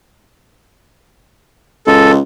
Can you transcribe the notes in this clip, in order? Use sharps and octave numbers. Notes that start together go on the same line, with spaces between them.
C#2 A4